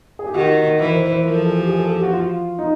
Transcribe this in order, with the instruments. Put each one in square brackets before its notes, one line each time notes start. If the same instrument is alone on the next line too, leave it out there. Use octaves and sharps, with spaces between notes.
[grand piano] G#4
G4
[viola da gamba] D#3 [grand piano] F#4
[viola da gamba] E3 [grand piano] A#4
[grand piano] C5
C5
C5
[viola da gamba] F3 [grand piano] A#4
[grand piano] A4
G#4
G4
G#4
A4
G4
F#4
F4
D#4